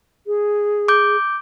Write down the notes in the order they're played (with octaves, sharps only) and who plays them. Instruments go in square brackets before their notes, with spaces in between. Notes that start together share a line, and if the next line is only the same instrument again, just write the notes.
[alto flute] G#4
[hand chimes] D6 G6